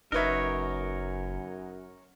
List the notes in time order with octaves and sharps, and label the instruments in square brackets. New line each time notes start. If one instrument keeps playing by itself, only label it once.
[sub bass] F#1 [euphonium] F#2 [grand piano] D#4 B4 E5 [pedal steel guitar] A#4 C#5